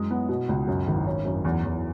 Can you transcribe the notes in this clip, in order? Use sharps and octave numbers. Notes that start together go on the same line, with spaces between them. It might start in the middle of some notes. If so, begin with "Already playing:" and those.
Already playing: F#2 G#3
B3
B2
C#2
F#2
G#1
C#4
F#2
E2
E2